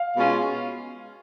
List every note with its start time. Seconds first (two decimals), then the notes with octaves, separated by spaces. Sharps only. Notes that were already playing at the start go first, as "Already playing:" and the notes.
Already playing: F5
0.16 B2 G#3 C#4 F4